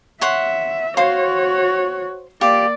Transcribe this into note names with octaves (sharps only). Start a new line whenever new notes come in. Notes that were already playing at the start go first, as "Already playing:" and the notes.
C#5 E5 F#5 C6
F#4 C5 C#5 F5 C6
A#3 F4 G4 D5